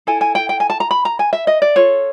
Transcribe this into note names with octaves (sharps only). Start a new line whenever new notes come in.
E4 A4 G#5
G#5
G5
G5
G#5
A5
A#5
B5
A#5
G#5
E5
D#5
D5
F4 A4 C#5